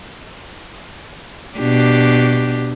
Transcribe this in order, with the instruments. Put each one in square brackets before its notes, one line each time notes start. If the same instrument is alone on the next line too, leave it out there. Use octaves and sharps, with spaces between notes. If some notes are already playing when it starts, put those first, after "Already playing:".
[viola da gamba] B2 D4 G4